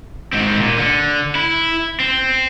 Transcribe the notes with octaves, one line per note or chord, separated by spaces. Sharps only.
G#2 C4
A#2
D3
E4
C4